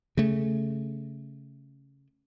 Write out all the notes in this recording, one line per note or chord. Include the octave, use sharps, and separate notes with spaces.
C#3 A3